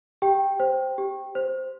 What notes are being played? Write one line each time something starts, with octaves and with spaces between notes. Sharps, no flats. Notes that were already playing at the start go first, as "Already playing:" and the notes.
G4 G5
C5
G4
C5